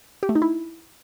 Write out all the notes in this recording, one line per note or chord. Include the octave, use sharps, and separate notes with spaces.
G4
A3
D#4
E4